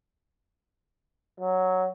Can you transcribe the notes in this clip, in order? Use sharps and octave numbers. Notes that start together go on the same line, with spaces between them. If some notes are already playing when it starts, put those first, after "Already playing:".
F#3